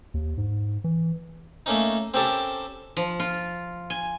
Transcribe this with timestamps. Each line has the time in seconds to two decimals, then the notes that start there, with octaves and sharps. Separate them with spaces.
0.14 D#2
0.37 G#2
0.84 E3
1.66 A3 A#3 C#4 D#4
2.14 C4 C#4 G4 A4 A#4 A5
2.97 F3
3.20 F4
3.90 G#5